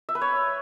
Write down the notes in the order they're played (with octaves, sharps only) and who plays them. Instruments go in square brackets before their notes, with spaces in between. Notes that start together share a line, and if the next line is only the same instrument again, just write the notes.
[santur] E5
B4
C#5